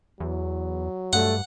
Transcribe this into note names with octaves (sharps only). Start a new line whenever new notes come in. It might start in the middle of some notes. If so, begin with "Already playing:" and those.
E2 F#3
G2 A3 F#5